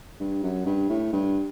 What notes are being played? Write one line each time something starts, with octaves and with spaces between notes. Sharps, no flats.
G2
F#2
G2
A2
G2